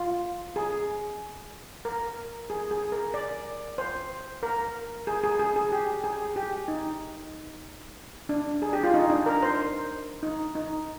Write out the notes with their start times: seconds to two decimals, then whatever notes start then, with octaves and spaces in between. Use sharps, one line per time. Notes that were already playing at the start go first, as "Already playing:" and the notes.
Already playing: F4
0.56 G#4
1.85 A#4
2.50 G#4
2.71 G#4
2.92 A#4
3.14 D5
3.78 C5
4.43 A#4
5.07 G#4
5.23 G#4
5.39 G#4
5.56 G#4
5.72 G4
6.04 G#4
6.36 G4
6.68 D#4
8.29 D4
8.62 G#4
8.73 G4
8.83 F4
8.94 D#4
9.10 D4
9.26 A#4
9.42 C5
10.23 D#4
10.55 D#4